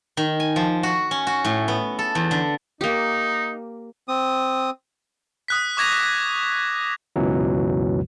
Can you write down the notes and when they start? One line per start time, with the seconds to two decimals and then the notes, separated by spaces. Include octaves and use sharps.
0.17 D#3
0.40 G#5
0.56 F3
0.83 F#4
1.11 C#4
1.27 F#4
1.45 A2
1.68 B3
1.99 A4
2.15 E2
2.31 D3
2.81 A#3 D#4 G4
4.08 C4 D#6
5.48 D#6 F#6 B6
5.77 C#6 D6 G#6 A#6 F7
7.16 C#2 F#2 B2 E3 F#3